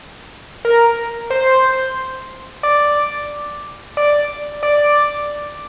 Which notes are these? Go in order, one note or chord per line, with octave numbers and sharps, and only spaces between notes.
A#4
C5
D5
D5
D5